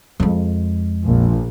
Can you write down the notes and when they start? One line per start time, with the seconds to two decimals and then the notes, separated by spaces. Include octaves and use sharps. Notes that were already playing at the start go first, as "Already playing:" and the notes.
0.20 F2 G#3
1.04 A#1